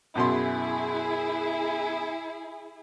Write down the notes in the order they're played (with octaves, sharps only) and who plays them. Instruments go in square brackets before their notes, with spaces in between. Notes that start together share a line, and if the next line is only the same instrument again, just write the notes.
[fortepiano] F#2 B2 C6 [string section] E4 G#4